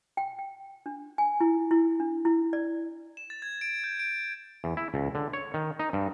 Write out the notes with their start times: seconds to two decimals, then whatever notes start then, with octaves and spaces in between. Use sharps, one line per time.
0.17 G5
0.39 G5
0.86 D4
1.18 G#5
1.41 E4
1.71 E4
2.00 D4
2.25 E4
2.53 D5
3.17 E7
3.30 A6
3.42 G#6
3.61 D7
3.84 G6
3.99 D7
4.64 E2
4.77 E4
4.94 C#2
5.15 D3
5.33 C#5
5.54 D#3
5.79 D#4
5.93 G2